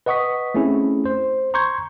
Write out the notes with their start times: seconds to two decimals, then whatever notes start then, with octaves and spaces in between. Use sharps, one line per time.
0.06 B4 D#5 F#5 C#6 D#6 B6
0.54 A3 C4 C#4 E4 G#4
1.06 C5
1.54 A#5 C6 C#6 G6 G#6